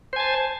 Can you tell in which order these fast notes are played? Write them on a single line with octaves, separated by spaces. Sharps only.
C5 G#5 A5